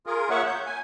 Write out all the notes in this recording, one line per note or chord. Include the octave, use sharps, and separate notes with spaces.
F4 G#4 A#4
A#3 C#5 E5 F#5 C#6
G6
G#5